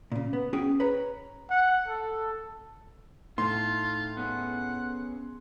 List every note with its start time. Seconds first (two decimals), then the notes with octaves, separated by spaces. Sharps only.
0.12 A#2 C#3
0.33 B3
0.53 C#4 F#4 G#4 G5
0.80 B4 C#5 A#5
1.50 F#5
1.88 A4
3.38 A2 D#4 F4 A5 C6
4.17 B3 C#4 G#4 F#5